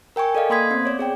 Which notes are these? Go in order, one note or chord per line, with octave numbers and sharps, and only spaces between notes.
A#4 G5 G#5 C#6
A4 D5 D#5 F5
A#3 B5 C6 D#6 G#6 B6
B3 C4
C#5 D5
G#4 D5 G5